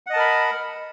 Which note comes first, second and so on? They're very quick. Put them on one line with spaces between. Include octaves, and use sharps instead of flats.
F#5 D#5 A5 A#4 B5